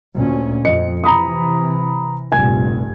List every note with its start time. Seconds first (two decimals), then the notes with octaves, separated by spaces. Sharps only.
0.15 D2 A#2 C#4
0.65 F2 D#5 C#7
1.04 C3 E3 A#5 B5 D#6
2.32 F1 A#1 G2 G#5 G#6